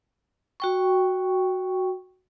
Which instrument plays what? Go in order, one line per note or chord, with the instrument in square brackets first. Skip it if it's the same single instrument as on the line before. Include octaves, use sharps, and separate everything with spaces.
[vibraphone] F#4 G5 C#6